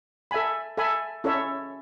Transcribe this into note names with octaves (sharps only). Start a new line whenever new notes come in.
A4 E5 G#5 B5
A4 E5 G#5 B5
C#4 E4 A4 C#5 E5